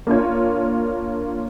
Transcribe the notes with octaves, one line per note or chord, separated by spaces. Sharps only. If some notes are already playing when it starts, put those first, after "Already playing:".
A#3 D4 F4 C#5